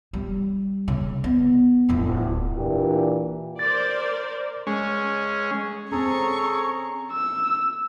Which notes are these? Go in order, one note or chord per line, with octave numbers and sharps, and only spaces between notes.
G3
C#3
B3
D1 F2
A#2 E3 D4 G4
A#4 C5 D5 A6
G#3 C#4
C4 C#4 G#4 A4 A#5 C#6
E6